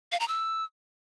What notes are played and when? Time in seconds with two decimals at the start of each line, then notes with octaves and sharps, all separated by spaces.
0.12 F5
0.20 A#5
0.28 E6